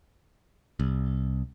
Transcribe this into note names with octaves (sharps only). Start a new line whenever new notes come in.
C2